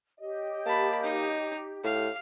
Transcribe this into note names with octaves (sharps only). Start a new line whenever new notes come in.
G4 C#5 D#5
A#3 A5 B5
D#4
A2 F5